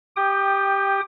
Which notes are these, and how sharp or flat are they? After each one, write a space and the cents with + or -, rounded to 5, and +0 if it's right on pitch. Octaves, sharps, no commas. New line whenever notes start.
G4 +0 G5 +10 D#6 -30